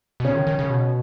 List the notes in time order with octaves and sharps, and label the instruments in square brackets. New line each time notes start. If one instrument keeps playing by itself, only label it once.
[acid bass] B2
[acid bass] C#3 [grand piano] C#4
[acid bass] D#3
D#3
C#3
B2